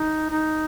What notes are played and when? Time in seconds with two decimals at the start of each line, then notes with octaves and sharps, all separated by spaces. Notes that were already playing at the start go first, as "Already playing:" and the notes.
Already playing: D#4
0.30 D#4